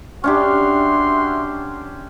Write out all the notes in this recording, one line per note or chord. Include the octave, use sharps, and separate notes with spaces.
C#4 D4 F#4 G4 E5 C6